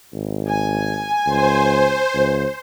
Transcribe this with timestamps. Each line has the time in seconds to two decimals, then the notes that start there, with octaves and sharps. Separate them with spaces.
0.13 G#1
0.49 G#5
1.26 C#2 C5
2.14 C#2